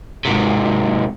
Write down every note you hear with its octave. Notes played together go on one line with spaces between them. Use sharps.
G#2 C3